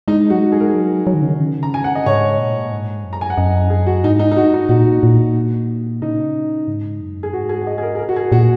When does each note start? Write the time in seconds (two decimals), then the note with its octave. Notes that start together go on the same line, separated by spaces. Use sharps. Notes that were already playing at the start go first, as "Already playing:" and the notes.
0.08 G#3 D#4
0.30 F#3 F#4
0.40 G#3
0.52 G#4
0.60 A#4
0.68 G#4
0.74 F#3
1.07 F#3
1.14 D#3
1.22 C#3
1.28 D#3
1.40 C#3
1.63 A#5
1.74 G#5
1.84 F#5
1.95 D#5
2.06 G#2 C#5
2.38 A#2
2.72 G#2
3.04 F#2
3.13 A#5
3.21 G#5
3.30 F#5
3.37 F#2 D#5
3.70 G#4
3.87 F#4
4.04 G#2 D#4
4.19 D#4
4.32 D#4
4.37 F#4
4.54 D#4
4.69 A#2 F#4
5.03 A#2
6.02 C#3 D#4
6.67 G#2
7.01 F#2
7.23 G#4
7.33 G#2 F#4
7.49 G#4
7.61 F#5
7.67 D#5
7.78 G#4
7.83 A#4
7.95 G#4
7.99 A#4
8.09 F#4
8.16 G#4
8.32 A#2 F#4